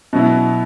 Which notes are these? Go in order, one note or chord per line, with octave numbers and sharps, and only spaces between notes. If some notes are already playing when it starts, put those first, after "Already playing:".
B2 F#3 B3 E4